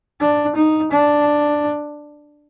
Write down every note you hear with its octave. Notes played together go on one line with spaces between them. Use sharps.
D4
D#4
D4